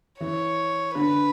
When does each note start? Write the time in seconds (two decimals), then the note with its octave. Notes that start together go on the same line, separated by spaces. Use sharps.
0.21 E3 C#5
0.95 D3 B4